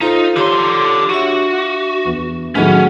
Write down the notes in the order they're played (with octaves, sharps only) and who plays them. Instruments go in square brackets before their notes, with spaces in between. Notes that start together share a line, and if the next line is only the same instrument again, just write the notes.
[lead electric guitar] D#4 [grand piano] F4 [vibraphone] A4 C5
[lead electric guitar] D3 C6 [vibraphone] G4 C#5
[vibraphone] D4 E5 [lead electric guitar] F#4
[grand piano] E2
[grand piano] A2 D#3 F#3 [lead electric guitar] C#4 [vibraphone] F#4 G#4 F#5